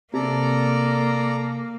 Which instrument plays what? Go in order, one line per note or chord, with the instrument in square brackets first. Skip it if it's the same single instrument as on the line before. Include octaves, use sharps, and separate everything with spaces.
[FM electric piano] C3 [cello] A#3 [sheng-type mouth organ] A4 D5 A#5